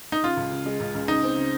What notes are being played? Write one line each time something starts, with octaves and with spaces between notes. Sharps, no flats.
D#4
C#3 F4
C#2
C#3
G#3
C#2
C#2
C#3 D#4
C4
C#3